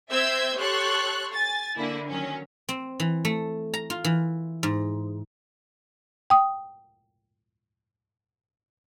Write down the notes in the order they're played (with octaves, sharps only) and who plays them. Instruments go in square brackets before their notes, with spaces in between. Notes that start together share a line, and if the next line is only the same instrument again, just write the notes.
[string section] C4 C5 E5 E6 G6 G#6
G4 A4 C#5 C6 C#6 F#6
G#5 A6
D3 A#3 E4
D#3 F#3 C#4
[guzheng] C4
E3
A3
A#5
F4
E3
G#2
[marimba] G5 D#6